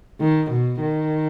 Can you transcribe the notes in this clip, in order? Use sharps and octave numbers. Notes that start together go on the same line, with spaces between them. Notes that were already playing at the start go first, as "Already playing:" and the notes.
D#3
B2
D#3